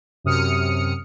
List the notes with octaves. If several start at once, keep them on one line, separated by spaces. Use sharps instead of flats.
F#2 C3 D#6 F6 C#7